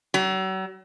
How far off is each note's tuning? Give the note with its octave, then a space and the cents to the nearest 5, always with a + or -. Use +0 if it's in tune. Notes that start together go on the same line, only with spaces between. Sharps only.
F#3 +40